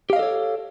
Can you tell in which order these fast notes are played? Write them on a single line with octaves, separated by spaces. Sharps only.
G4 F5 D#5 A4 C#5